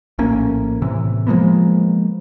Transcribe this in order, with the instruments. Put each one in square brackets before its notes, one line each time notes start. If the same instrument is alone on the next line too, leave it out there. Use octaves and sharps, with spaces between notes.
[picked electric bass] A#1 A2 A#3 C#4
A2 C3 E3
F3 G#3 A#3 B3